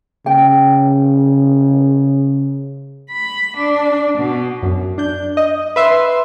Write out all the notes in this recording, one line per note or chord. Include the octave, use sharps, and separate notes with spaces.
C#3 G5
B5
D4
B2
F#2
D4 G6
D#5
B4 E5 C6